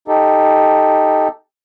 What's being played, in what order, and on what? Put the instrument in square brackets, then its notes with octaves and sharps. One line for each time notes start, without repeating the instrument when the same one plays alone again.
[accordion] D#4 G4 A4